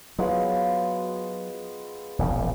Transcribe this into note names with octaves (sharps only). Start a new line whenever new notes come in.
F#3 G#3 B3 F4
E1 A#1 C#3